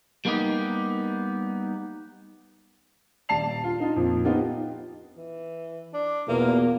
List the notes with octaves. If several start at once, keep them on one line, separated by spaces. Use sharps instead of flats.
G3 A#3 B3 D#4 G4
D#1 D5 A5 C7 F7
F4
D#4 F4
F2 A#2
B3 D#4 F4 G4
E3
D4
E2 B2 A#3 F4